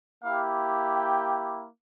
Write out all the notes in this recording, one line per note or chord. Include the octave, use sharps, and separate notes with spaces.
A#3 E4 G4 F5
G5